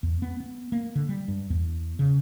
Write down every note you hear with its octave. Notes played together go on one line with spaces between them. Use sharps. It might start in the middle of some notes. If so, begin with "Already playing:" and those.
E2
B3
B3
A#3
D3
G3
G2
E2
C#3